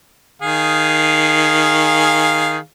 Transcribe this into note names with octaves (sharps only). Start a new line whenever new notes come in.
D#3 G#4 F5